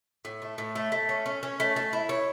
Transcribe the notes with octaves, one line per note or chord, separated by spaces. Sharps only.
A2
A3
A2
A3
A3
C#4
C#4
C#4
A3
A3
E4
C#5